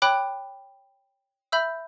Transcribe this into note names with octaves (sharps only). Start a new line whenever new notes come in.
C#5 G5 B5 D6 F#6
E5 B5 E6 G6